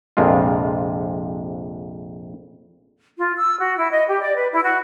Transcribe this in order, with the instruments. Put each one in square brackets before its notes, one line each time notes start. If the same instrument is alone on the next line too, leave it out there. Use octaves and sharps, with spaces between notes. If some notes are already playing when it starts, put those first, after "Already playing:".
[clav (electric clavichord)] A#1 F2 C3 G#3 F4
[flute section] F4
E6
F#4
E4
D#5
G4
D5
B4
E4
F#4